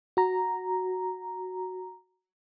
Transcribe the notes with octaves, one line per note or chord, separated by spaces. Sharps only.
F#4 A#5